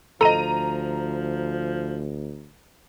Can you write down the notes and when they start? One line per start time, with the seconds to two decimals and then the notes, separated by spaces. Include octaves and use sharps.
0.21 D2 F3 A4 D#5 A#5 D#7